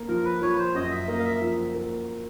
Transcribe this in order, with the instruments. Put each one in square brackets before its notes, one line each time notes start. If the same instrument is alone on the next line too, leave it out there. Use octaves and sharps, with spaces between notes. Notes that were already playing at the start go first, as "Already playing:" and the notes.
Already playing: [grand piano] A#3
[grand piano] F3 [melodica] A#4
[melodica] B4
[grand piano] F3 [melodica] C#5
[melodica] C5
[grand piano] F#2 [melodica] D#5
[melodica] E5
[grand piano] A#3 [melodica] D#5
[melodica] F5
E5
[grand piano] F3
A#3